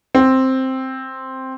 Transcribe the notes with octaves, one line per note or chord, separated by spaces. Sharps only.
C4